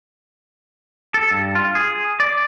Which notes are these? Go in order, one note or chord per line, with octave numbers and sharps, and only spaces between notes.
A4
G2
F4
G#4
D5